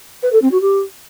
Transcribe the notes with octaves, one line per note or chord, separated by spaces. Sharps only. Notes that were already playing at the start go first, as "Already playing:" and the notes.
B4
A4
C4
F#4
G4